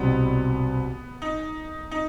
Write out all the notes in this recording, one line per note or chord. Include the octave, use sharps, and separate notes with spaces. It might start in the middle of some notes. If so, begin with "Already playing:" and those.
Already playing: C2 B2 G3 B3 C4 F#4
D#4
D#4